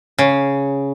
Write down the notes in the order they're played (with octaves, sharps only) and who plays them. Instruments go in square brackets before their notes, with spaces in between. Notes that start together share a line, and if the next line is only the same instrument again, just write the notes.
[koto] C#3